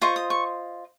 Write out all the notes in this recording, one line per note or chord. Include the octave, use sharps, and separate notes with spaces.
F4 C5 D#5 C#6
D#6
C#6